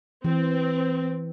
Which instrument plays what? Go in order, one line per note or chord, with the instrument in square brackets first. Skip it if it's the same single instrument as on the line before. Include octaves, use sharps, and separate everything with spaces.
[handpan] E3 [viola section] C4